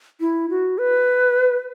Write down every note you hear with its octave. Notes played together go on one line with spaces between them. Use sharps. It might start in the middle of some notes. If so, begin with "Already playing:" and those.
E4
F#4
B4